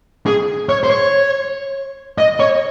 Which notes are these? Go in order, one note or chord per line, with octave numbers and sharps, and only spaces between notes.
G#4
C#5
C5
C#5
D#5
C#5